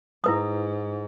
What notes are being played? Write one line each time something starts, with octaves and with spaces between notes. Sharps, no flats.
G#2 E4 B4 D#6